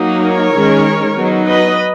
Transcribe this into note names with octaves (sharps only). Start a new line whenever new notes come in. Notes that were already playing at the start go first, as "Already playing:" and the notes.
Already playing: F#3 A#3 D#4
A#4 C#5
D#3 G#3 C#4
F#3 B3 D#4
B4 D#5